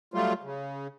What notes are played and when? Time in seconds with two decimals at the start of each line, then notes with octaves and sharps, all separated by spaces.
0.14 F#3 G3 A3 F4
0.43 C#3